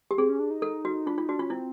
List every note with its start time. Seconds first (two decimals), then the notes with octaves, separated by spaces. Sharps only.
0.11 G4
0.18 C4 G#4
0.29 C#4
0.40 D4
0.51 D#4
0.62 A4
0.85 F#4
1.06 D4 F4
1.18 D#4 F4
1.29 D4 F#4
1.39 C#4 F4
1.50 C4 E4